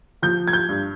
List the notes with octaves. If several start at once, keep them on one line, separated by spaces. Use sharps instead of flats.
F3 G6
G#6
G6
G2